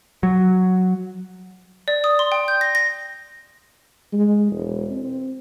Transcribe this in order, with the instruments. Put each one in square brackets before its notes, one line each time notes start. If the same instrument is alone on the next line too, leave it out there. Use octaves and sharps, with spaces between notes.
[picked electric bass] F#3
[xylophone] D5
D#6
C6
G5
G6
A#6
A#6
[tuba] G#3
E1
C4